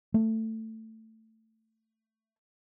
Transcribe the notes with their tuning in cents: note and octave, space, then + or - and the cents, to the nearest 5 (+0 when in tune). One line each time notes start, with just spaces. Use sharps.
A3 +15